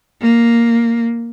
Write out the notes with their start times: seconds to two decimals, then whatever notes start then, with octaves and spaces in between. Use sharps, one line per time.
0.21 A#3